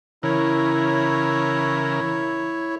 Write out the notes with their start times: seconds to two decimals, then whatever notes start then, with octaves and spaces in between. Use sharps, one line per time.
0.23 C#3 E3 E4 A#4 C#5